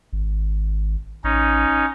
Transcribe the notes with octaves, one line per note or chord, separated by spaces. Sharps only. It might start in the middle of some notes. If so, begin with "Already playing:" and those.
G#1
A1 C#4 D#4